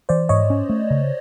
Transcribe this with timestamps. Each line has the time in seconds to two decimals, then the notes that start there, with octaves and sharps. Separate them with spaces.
0.09 E3 C5 D5
0.29 G#2 C#5 D#5
0.50 C#4
0.69 A3
0.90 C#3